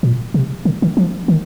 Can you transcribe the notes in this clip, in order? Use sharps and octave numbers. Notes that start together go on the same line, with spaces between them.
A#2
C3
D3
D#3
F3
D#3